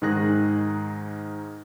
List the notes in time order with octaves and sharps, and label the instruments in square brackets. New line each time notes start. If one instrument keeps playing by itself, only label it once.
[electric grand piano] G#2 D#3 D#4 G#4 F#6 A#6